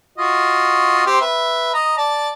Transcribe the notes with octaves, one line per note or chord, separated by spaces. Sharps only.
F4 F#4 D#5
C4 G4 C5
B4 E5
D#5 A#5
D5 A5